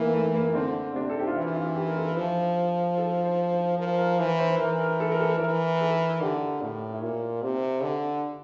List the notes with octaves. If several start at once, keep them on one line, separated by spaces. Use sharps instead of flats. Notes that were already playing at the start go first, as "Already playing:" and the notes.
Already playing: E3 A3 A#3
A3
A#3
D3 C4
C3 D4
A4
G4
F4
E3 E4
F4
G4
A#4
A4
F3
A4
C5
C5
F3 A#4
A#4
E3 C5
C5
E3 A#4
A#4
A4
A#4
A4
E3 A#4
A4
D3 G4
A2
E4
A#2 F4
C3 G4
D3